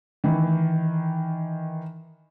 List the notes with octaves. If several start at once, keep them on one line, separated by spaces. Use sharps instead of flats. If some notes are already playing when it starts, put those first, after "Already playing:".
D#3 E3